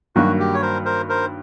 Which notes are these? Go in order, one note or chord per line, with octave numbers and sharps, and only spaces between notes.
G2 D#3 F#3 A#3 D#4 F#4
G4
C#5
A#4 C5
A#4 C5
A#4 C5